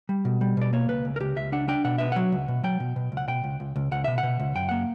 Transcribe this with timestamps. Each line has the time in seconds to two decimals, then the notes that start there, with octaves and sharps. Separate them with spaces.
0.09 G3
0.25 B2
0.41 G3
0.57 B2 D5
0.73 A#3 C#5
0.89 C#2 B4
1.05 C#2
1.16 A#4
1.20 C#2 G4
1.36 C#2 E5
1.52 D4 F#5
1.68 D4 G5
1.84 B2 F#5
1.98 B3 E5
2.12 F#3 F#5
2.32 C#2
2.48 B2
2.64 F#3 G5
2.80 B2
2.96 B2
3.12 C#2
3.17 F#5
3.28 B2 G5
3.44 C#2
3.60 C#2
3.76 C#2
3.92 C#2 F#5
4.04 B2 E5
4.18 F#5
4.23 B2
4.39 C#2
4.55 F#2 G5
4.69 A#3 F#5